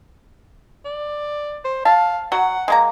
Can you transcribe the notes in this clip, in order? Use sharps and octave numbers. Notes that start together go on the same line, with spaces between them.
D5
C5
F5 A5
F#3 F#5
G#3 A#3 A#5